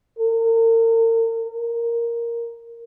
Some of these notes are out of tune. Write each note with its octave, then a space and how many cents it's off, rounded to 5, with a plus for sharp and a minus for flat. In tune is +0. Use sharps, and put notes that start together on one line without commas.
A#4 -40
A#4 +0